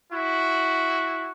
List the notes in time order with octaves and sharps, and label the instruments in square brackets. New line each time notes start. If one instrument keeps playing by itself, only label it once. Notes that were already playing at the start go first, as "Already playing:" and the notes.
[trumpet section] E4 F#4